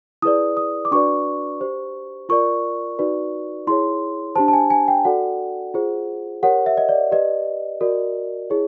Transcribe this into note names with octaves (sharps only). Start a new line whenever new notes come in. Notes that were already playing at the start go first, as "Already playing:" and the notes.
E4 G#4 B4 D5 D#6
D#6
D6
D4 F#4 B4 D5 C#6
G4 C5
F4 A#4 D5 C#6
D#4 F#4 B4 D5
E4 G#4 C#5 C6
D4 G4 C5 A5
A5
G#5
G#5
G5
F#4 A4 D5 F#5
F4 G#4 C5
G4 A#4 C#5 F#5
E5
D#5
D5
G4 B4 D5 D#5
F#4 A#4 D5
E4 G#4 C#5